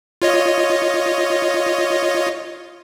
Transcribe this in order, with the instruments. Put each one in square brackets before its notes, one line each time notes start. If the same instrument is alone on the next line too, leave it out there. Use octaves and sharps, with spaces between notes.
[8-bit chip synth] F4 C#5 D#5